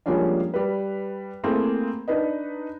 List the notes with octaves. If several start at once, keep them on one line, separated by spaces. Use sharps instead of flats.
F3 G3 G#3 A#3 C#4 D4
G3 B4
A3 A#3 C4 E4 G#4
D4 D#4 B4 D#5